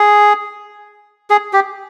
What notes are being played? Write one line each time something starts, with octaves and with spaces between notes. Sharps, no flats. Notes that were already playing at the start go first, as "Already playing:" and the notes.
Already playing: G#4
G#4
G4